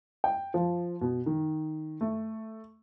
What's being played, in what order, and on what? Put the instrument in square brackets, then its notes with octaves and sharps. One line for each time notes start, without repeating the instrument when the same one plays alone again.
[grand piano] G5
F3
B2
D#3
A3